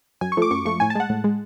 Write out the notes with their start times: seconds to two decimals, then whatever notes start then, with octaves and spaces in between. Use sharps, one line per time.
0.21 F#2 G#5
0.32 C#6
0.37 F3 A3 D6
0.51 F#2 C#6
0.65 F3 A3 C#6
0.80 A2 G#5
0.90 A5
0.95 G#3 F#5
1.10 A2
1.24 G#3